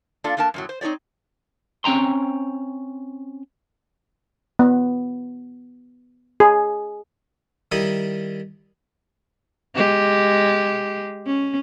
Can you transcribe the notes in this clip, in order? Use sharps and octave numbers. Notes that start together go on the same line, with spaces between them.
A#3 D4 F4 A4 D5
A3 A#3 D4 A#4 A5
F#2 A2 F#3
C5
C4 D#4 G4 C#5 D5
C4 C#4 G5 A#5 C6
B3
G#4
D#3 G3 E4 D#6
G#3 G4
C#4